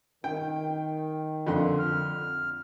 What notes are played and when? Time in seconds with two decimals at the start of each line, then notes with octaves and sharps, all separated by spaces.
0.24 D#3 G5
1.47 F2 D3 C6
1.79 F6